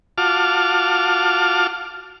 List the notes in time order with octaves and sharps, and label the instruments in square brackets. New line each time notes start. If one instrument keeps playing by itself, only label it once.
[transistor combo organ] F4 F#4 A5 D6 F6